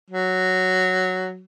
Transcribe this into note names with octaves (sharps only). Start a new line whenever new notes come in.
F#3